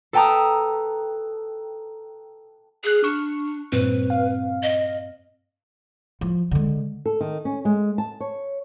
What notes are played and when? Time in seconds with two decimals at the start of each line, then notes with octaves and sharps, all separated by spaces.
0.13 A4 B4 G5 A5 A#5 D#6
2.84 G#4 F6 F#6
3.04 D4 C#6
3.72 G2 A#2 C4 B4
4.10 F5
4.63 D#5
6.21 F3
6.51 D3 G#3
7.06 A4
7.21 D#3
7.45 C#4
7.65 G#3
7.98 A5
8.20 C#5